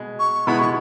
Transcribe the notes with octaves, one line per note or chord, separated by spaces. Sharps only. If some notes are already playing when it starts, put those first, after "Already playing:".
Already playing: B2 G#3
C#6
B2 G#3 B3 E4 B5
C#6